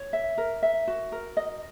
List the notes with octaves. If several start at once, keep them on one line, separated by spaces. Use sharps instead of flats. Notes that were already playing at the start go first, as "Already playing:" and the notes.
Already playing: C#5
E5
A#4
E5
F#4
A#4
D#5